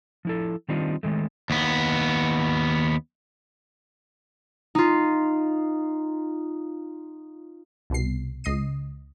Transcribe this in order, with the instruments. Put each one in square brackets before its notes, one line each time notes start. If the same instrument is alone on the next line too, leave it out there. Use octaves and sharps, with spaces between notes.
[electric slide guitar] F3 E4 A4
D#3 G3 C4 D4 D#4 F4
D#3 G#3 A3
[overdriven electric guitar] D#2 B3
[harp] D#4 F4
[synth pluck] C2 B2 C7
C#2 D#5 C7 D#7